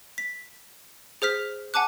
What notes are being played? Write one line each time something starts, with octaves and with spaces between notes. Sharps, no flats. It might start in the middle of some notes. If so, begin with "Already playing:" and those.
B6
G#4 C5 F6 B6
F#5 G#5 A5 D6 F#6